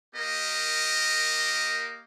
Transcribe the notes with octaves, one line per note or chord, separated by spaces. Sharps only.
A#3 G4 A#4 D#5